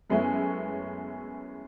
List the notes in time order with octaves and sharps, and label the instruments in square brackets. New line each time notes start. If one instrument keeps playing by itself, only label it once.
[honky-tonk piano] F#2 G#3 A3 B3 C#4 E4